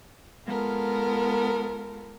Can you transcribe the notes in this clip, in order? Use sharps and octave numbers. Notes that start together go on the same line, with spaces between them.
G#3 B3 F4 A4 A#4